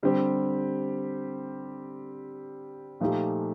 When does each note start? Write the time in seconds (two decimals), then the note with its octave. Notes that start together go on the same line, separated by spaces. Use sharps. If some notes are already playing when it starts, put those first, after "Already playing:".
0.03 D3 G3 C4 G4
3.00 A#2 F3 A3 D#4 G4